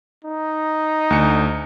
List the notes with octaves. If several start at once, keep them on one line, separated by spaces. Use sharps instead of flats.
D#4
D2 C#7